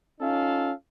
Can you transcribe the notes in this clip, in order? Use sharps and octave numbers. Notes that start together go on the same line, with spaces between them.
C#4 D#4 F4 A4 F5